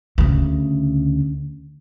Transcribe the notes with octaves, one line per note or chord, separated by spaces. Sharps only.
D2 C#3